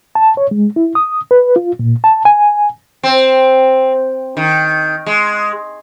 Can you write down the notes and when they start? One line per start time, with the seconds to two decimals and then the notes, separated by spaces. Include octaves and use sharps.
0.15 A5
0.37 C#5
0.51 G#3
0.76 E4
0.95 D#6
1.31 B4
1.56 F4
1.79 A#2
2.04 A5
2.25 G#5
3.03 C4
4.37 D#3
5.06 G#3